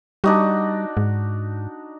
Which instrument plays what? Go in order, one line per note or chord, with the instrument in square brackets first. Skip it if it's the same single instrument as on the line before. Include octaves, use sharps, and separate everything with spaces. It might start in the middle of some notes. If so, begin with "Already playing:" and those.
[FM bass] G3 [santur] D4 D#4 F#4
[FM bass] G#2